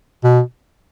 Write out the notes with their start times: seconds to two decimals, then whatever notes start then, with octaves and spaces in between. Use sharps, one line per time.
0.24 B2